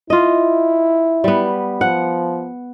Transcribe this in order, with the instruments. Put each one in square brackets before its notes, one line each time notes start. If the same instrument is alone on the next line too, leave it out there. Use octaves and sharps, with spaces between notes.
[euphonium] E4 [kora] F4 D#5
[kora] G3 B3
[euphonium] F3 [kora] F#5